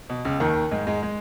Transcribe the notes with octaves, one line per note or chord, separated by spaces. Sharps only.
B2
C#2 C#3
D#2 D#3
G#2 G#3
G#2 G#3
G#3